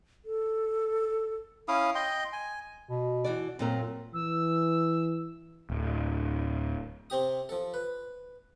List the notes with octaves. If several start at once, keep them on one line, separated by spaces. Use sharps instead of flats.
A4
C#4 E4 F5 D#6
D#5 G5 C6
G#5
B2
E3 F#4 D5
F#2 A#2 C4 A#4
E3 E6
D1
C3 C4 G4 D#6
F3 A4
B4